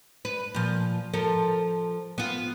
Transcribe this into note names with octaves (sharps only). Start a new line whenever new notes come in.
B4
A#2 F3
F3 A4 A#4
B3 F4